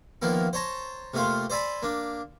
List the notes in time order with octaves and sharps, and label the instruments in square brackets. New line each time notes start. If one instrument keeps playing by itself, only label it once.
[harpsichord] D#3 F3 A#3 B3 E4
C5 C#5 A5 A#5
C3 A3 A#3 F4 C5
C5 D5 E5 G#5 B5
A#3 D4